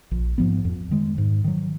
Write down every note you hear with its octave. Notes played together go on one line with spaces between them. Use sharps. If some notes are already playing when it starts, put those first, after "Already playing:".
A#1
G#2 F3 B3
F2
D#3 G#3
G#2
D#3 F#3